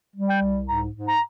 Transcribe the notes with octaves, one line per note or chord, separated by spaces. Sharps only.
G3
G5
C2
G#2 A#5
G#2
A#5